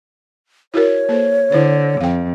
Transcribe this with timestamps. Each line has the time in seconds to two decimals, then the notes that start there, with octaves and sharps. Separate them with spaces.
0.74 E4 F#4 A#4 C#5
1.09 A#3 A4 C5
1.52 D3 E4 C5
2.01 F2 F5 G5